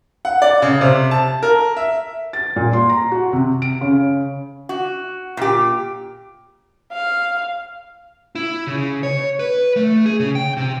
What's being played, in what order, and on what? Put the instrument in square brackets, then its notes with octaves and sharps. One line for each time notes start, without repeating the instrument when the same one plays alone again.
[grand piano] F#5
D5
C#3
C3
A5
A#4
E5
[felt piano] A6
A#2
C6
A#5
F#4
C3
D7
C#3
[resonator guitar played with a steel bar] F#4
A#2 G4
[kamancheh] F5
[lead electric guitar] E4
C#3
C#5
B4
A3
G#4
C#3
G5
C3